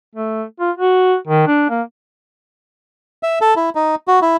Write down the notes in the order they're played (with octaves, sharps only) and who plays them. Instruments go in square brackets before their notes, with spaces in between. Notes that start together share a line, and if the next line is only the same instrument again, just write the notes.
[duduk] A3
F4
F#4
D#3
D4
A#3
[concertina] E5
A4
E4
D#4
F#4
E4